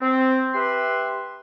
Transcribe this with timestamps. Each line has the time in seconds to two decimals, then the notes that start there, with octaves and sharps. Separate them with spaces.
0.02 C4
0.54 G4 B4 E5 C6